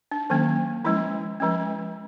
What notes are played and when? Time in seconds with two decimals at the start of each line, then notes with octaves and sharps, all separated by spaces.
0.11 D4
0.30 D#3 F#3 A#3 C#4
0.85 F3 G#3 C#4 E4
1.40 F3 G#3 C#4